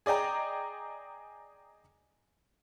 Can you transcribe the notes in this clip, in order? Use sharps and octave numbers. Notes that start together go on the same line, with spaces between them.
G#4 D5 D#5 G5 A#5